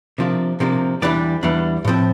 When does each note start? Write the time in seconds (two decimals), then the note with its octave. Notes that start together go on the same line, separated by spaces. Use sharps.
0.18 C3 F3 A#3 D4
0.60 C3 F3 A#3 D4
1.02 E2 E3 G3 D4 D5
1.43 E2 E3 G3 D4
1.85 A2 F3 C4